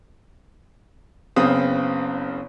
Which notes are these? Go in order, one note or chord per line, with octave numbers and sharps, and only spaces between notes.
F#1 C#3 B3 C4 D#6